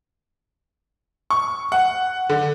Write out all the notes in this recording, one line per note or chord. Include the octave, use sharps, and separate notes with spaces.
C#6
F#5
D3